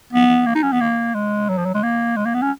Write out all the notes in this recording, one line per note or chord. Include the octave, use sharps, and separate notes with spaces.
B3
A#3
D#4
C#4
B3
A#3
G#3
F#3
F3
F#3
G#3
A#3
G#3
A#3
B3
C#4